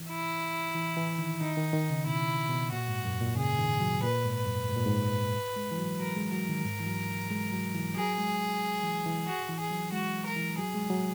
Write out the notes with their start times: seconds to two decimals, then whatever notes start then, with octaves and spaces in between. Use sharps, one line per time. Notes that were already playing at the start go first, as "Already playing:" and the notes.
Already playing: E3
0.09 E4
0.75 E3
0.97 E3
1.19 D#3
1.40 D#3 D#4
1.57 D#3
1.73 D#3
1.90 C#3
2.06 B2 E4
2.49 B2
2.71 A#2 F#4
2.88 G#2
3.05 F#2
3.21 A#2
3.37 C#3 G#4
3.59 D#3
3.80 F#3
4.03 A#2 B4
4.25 G#2
4.35 B4
4.46 F#2
4.69 G#2
4.77 A#2
4.86 G#2
5.56 G#3
5.71 E3
5.78 F#3
5.99 F#3 A#4
6.16 G#3
6.32 F#3 A#4
6.49 D#3
6.65 G#2
6.80 E3
6.87 F#3
7.30 G#3
7.52 F#3
7.74 E3
7.96 F#3 G#4
8.18 G#3
8.83 E3
9.06 E3
9.27 F#4
9.49 E3
9.60 G#4
9.71 F#3
9.92 G#3 F#4
10.26 A#4
10.36 E3
10.58 F#3 G#4
10.74 G#3
10.90 F#3